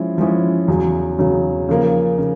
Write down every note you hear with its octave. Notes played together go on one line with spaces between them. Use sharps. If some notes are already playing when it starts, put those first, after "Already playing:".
Already playing: F3 G#3 C#4 E4
F3 G#3 C#4 E4
E2 C#3 F#3
E2 C#3 F#3
C#3 F3 A#3
C#3